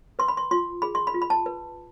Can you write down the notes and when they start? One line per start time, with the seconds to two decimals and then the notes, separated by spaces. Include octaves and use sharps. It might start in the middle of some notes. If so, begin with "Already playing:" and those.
0.19 B4 C6
0.28 B5
0.37 C6
0.51 F4 C6
0.82 G#4 B5
0.95 C6
1.07 B5
1.14 F4
1.22 B5
1.30 A5
1.46 B4